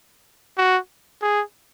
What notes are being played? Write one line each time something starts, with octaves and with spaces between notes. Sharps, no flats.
F#4
G#4